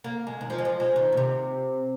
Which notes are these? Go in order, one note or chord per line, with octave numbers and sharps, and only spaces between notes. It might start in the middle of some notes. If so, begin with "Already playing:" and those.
A#3
G#3
D#3
F3
G#3
F3
G#3
D#3
A#2
C3